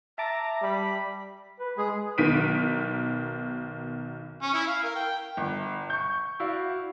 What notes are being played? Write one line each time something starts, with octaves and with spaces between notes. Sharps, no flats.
E5 A5 A#5 D6
G3 B5
B4
G#3 G#4
B1 D#3 B6 D7 D#7
C#4
E4
F5
A#4
G5
G1
C#6 G6
E4 F#4 D5 F5